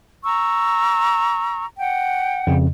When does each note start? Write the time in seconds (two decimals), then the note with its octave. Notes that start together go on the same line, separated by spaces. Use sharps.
0.24 A#5 C#6 E6
1.78 F#5 G5
2.47 F2 C#3